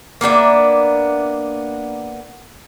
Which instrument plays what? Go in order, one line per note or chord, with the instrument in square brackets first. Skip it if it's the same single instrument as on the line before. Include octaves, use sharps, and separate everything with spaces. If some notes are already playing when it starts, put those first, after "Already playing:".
[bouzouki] A#3 B3 D4 E5